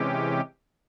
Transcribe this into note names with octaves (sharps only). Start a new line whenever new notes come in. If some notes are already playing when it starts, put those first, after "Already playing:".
Already playing: C3 E3 G#3 C#4 G4